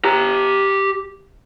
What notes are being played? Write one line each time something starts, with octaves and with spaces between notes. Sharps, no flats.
G4 A#5